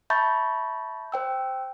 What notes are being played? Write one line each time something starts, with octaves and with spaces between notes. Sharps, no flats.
E5 A5 B5 C#6 G6 A6
C5 G5 E6